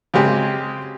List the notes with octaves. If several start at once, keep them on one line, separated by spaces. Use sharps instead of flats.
C#3 F#3 G#3 C4 G4 G#4